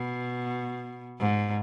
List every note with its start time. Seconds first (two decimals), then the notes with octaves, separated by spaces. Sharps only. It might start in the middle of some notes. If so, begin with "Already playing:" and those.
Already playing: B2
1.20 G#2